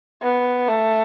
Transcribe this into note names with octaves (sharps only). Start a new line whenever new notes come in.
B3
A3